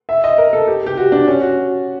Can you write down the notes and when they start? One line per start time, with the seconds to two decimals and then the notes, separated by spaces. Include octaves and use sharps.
0.09 E5
0.24 D#5
0.38 A#4
0.53 A4
0.67 G4
0.86 G4
0.97 F#4
1.12 D4
1.27 C#4
1.42 F#4